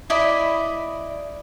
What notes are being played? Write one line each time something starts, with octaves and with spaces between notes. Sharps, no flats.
E4 D5 D#5 B5